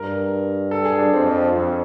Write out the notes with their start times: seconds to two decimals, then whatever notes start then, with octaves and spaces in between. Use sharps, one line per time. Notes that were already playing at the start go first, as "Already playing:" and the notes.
Already playing: G2 A#4
0.71 A4
0.85 G#4
0.98 D4
1.13 F2 C4
1.53 F2